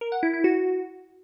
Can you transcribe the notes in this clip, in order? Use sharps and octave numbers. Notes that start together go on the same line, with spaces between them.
A#4
F#5
E4
E4
F#4